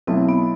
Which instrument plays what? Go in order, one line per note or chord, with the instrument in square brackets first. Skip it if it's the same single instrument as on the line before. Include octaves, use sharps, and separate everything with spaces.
[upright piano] B1 B2 A3 E4 [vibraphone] C4
[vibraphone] B3